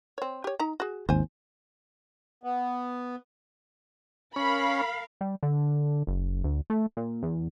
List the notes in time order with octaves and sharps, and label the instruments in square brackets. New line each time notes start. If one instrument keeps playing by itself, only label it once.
[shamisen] C4 C#5
G4 C#5
D#4 A#5
F#4 G#4
[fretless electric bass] G#1 D#2 [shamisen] C5 G#5
[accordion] B3
[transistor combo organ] C#4 [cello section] A#4 F5 [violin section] B5
[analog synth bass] G3
D3
F#1
D2
A3
A#2
E2